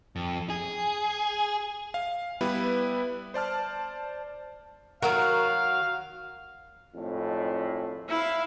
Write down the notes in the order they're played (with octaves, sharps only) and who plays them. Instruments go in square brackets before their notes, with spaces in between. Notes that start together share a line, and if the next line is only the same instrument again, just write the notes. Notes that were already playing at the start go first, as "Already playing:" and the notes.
[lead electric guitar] F2
G#4
[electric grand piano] F5
G3 B3 E4 B4
C5 D5 A5 F6
[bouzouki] D#3 F#3 F#4 [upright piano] A#4 [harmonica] F5
[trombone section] G#1 F2 A2
[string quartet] E4 E5 F5